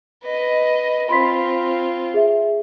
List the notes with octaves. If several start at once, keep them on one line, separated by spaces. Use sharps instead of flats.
B4 D#5
C4 F4 B5 C6 B6
G#4 E5